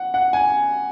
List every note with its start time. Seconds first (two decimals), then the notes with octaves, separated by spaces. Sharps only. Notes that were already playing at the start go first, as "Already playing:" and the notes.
Already playing: F#5
0.14 F#5
0.33 G#5